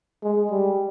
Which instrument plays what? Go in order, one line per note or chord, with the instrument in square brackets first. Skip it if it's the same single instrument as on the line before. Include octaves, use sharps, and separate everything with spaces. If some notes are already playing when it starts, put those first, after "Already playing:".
[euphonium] G#3
G3